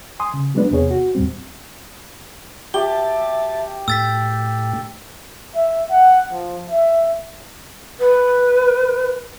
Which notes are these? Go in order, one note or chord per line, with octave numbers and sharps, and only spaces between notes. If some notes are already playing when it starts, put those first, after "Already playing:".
G#5 C6 D#6
C#3
F#3 G#3 A3 B3 D4 B4
E2 C3 B3 G#4 C#5
F#4
D#2 A2 G3 C4
G4 E5 A5 G7
A2 A3 G5 E6 A6 B6
E5
F#5
F3
E5
B4